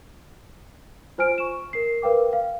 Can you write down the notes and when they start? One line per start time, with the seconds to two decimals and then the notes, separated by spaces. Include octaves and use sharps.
1.18 F4 C5 G#5 F6 D7
1.38 C#6 E7
1.73 A#4 C7
2.02 A#4 B4 F5 G5 D6
2.33 F5